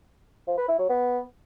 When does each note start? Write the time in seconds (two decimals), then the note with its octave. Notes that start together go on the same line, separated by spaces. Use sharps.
0.47 F3
0.57 B4
0.68 E4
0.78 F#3
0.89 B3